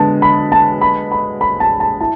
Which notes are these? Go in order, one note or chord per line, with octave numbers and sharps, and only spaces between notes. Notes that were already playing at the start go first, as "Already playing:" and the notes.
Already playing: D3 G#3 B3 A5
B5
A5
B5
B5
B5
A5
A5
E4 A5